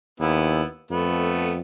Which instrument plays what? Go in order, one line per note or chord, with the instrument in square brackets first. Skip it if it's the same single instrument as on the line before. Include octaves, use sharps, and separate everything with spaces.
[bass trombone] D#2 [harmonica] B3 E4
[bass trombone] F2 [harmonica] A3 B3